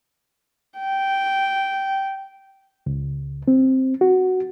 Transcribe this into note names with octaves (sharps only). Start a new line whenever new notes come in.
G5
C#2
C4
F#4